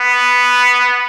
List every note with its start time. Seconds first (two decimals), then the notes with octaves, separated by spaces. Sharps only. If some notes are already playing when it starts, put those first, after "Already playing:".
Already playing: B3